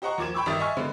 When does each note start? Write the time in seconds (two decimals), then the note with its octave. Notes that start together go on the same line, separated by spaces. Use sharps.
0.02 G4 C5 D#5 F#5 A#5 C#6
0.18 D#2 F3 D6 G#6 E7
0.34 G5 B5 C#6 D6 E6
0.46 G1 D#3 G4 E5 D#6 A6
0.60 D#5 E5 G#5 C#6 F6
0.77 D3 G#3 B3 C4